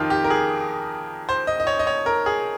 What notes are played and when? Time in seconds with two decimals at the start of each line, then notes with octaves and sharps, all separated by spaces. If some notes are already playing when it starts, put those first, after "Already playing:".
Already playing: F2 D#3 F4 G4
0.10 G4
0.24 A#4
0.30 G#4
1.29 C5
1.47 D#5
1.60 D#5
1.67 C#5
1.79 D#5
1.87 C#5
2.06 A#4
2.26 G#4